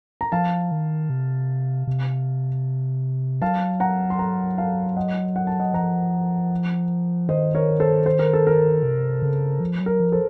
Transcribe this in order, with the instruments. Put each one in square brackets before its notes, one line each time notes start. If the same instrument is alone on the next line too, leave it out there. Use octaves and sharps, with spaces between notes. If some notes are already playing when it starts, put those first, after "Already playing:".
[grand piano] A#5
[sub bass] F3 [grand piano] F5 A5
[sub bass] D#3
C3
C3
[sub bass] F#3 [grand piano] F5 A5
[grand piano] F#5 A#5
C6
F#5 A#5
F5 A5
D#5 F#5
F#5
A5
D#5 F#5
[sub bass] F3 [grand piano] F#5 A#5
[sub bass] D#3 [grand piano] C5 D#5
[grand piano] A#4 C#5
A4 C5
C5
A#4
A4
A#4
[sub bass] C3
C#3
F3
F#3
[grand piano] A#4
[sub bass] F3
[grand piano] A4 C5